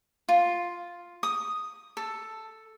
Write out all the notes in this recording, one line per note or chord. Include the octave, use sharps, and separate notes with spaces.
F4
D#6
A4